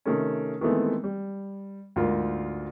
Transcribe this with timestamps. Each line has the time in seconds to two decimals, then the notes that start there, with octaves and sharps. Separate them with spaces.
0.05 C3 D#3 A3 C#4
0.61 D#3 E3 G#3 A3 B3 C4
1.04 G3
1.96 D2 G#2 A#3 F4 A#4